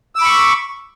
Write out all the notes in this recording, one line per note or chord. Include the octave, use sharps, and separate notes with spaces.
B5 C#6 D6 E6